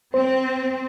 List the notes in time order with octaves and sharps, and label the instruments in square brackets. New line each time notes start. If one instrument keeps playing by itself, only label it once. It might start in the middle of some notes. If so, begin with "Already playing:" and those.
[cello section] C4 [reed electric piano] C5